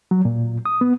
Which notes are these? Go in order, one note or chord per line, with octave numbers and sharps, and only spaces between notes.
F#3
A#2
D#6
B3